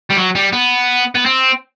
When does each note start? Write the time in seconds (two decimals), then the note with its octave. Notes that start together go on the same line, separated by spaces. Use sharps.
0.10 G3
0.17 F#3
0.36 G3
0.53 B3
1.15 B3
1.26 C4